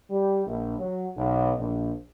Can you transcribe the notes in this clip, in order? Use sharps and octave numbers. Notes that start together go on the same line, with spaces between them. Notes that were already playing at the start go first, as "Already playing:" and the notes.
G3
A#1
F#3
B1
A#1